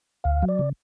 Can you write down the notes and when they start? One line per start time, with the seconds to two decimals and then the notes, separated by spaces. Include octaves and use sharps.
0.24 D2 F5
0.42 F#3
0.48 D5
0.59 C#3